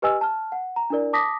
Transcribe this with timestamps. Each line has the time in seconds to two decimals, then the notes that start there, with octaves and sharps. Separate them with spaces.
0.02 G4 B4 D#5 G#5 E6
0.21 A5 F6
0.52 F#5
0.76 A#5
0.90 D4 E4 A#4 D5
1.13 A5 D6 D#6 A#6 B6